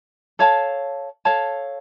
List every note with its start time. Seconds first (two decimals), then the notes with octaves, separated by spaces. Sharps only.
0.39 A4 C#5 F5 A5
1.25 A4 C#5 F5 A5